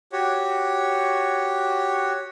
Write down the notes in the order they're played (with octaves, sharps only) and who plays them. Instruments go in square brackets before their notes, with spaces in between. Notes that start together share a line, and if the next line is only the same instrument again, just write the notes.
[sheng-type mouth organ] F#4 G4 C#5